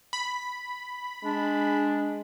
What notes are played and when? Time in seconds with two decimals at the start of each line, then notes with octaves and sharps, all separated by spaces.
0.13 B5
1.24 G#3 D4